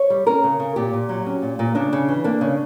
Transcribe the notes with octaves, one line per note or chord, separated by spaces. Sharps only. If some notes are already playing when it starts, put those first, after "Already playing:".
Already playing: C#5
G3
C#4 A#4
C#3
C#3
A#2 G4
A#2
F#3
C#4
A#2
A#2
C#3 D4
C#3
E3
A#3 D4
C#3